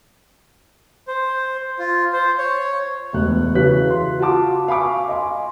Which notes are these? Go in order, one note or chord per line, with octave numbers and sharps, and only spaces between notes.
C5
F4
C5
C#5
E1 D2 F#6
C#3 E3 F#3 C#5 F#6 B6
C6
F4 F#4 F#5 A5 D6
F5 G#5 B5 C#6 D6
D#5 F5 G#5 C6